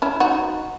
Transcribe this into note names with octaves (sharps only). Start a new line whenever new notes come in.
C#4 E4
D#4 F#4